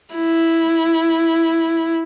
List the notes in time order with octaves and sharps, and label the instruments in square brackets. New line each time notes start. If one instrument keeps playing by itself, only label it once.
[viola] E4